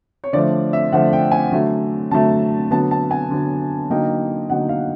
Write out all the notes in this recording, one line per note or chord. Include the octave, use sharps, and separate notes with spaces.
C#5
D3 F3 A3 D5
E5
D3 F3 A3 F#5
G5
G#5
D3 F#3 A3
D3 F#3 A3 A5
D3 F#3 B3 A5
A5
G#5
D3 F#3 B3
D3 F#3 A#3 D#4 G5
D3 F#3 A#3 D#4 F#5
F5